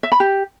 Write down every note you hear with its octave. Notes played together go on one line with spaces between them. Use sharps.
E5
B5
G4